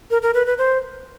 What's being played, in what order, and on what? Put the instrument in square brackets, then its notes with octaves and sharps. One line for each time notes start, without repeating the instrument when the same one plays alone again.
[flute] A#4
A#4
B4
B4
C5